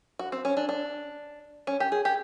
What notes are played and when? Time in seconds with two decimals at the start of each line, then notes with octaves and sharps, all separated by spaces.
0.19 F#4
0.32 C4
0.45 C#4
0.57 D4
0.69 D4
1.67 C#4
1.80 G4
1.92 G#4
2.05 G4